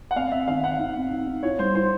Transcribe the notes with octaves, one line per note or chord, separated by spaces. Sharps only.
F#5
C4 F5
C4 E5
D#3 F5
C4 F#5
D#4
C4
D#4
D#4
E4 C#5
G3 C5
E4 C5